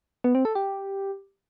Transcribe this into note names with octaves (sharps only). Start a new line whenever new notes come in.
B3
C4
A4
G4